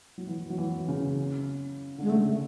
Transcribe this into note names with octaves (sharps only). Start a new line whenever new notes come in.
F#3
E3
F#3
E3
C#3
D3 G#3
C#3 A3